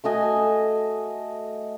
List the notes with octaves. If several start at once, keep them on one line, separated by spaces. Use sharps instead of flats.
A3 F#4 D#5 G#5